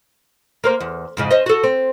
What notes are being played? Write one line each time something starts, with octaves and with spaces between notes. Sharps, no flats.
A#3 A#4 C5
E2
F2 G#2 C#3
C#4 C5 D#5
F#4 A4
C4